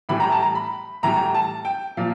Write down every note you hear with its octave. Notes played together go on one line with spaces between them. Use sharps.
A2 E3 G3 B5
A#5
A5
A#5
B5
A2 E3 G3 A#5
A5
G5
A#2 F3 F5